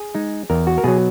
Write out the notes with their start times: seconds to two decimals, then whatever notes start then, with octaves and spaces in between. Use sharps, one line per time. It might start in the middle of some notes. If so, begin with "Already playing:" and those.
Already playing: G#4
0.15 G#3 D#4
0.50 E2 A#4
0.67 F#4
0.78 A#4
0.84 B2 F#3 G#4